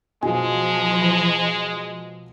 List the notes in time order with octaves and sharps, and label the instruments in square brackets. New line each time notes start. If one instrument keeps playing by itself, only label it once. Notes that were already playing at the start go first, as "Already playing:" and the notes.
[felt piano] B2 F#3 F4 [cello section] F3 [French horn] G#3 [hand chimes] G#5